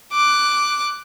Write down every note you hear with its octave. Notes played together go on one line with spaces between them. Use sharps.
D6 F#6